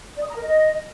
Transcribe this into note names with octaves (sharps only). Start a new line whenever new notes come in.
D5
D#6
A#5
A#4
D#5